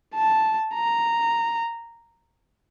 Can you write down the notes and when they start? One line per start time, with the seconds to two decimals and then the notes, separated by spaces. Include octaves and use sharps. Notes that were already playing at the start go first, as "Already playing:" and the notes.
0.15 A5
0.75 A#5